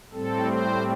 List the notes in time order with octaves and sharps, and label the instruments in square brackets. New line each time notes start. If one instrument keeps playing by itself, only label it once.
[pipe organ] A2 G3 C4 A4
C5